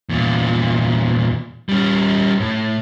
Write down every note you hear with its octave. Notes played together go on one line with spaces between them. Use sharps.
E2 A#2
G3 C#4
A2